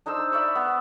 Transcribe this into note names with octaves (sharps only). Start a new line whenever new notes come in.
D4 D#4 C5 E6
D5 E5 B5 C#6
B3